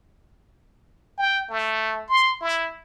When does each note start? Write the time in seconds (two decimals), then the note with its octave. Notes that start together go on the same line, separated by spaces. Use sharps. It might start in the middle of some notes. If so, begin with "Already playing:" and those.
1.19 G5
1.50 A3
2.09 C6
2.41 E4